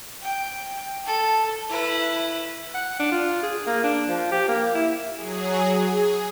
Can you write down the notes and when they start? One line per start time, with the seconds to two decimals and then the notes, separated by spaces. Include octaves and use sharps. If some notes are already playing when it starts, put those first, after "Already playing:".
0.21 G5
1.05 A4
1.70 E4 B4
2.74 F#5
2.99 D4
3.11 F4
3.43 G#4
3.67 A#3
3.84 D4
4.08 F3
4.32 G4
4.48 A#3
4.74 E4
5.16 F#3 G#4
5.79 G#4